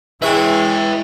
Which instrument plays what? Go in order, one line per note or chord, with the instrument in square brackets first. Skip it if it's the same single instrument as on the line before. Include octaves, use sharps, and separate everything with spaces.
[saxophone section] E3 G#3 [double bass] E4 [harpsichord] G#4 C#5 E5 [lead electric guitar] B4 G5